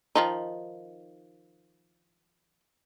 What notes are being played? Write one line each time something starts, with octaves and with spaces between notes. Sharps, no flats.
D#3 F3 D#4